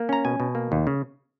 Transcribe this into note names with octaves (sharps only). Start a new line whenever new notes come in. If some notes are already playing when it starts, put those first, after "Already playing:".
Already playing: A#3
C#4 A#5
B2 G#5
B2
A#3
D#2
C#3